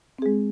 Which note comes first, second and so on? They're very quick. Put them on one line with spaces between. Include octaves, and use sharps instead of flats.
C4 G#4 G#3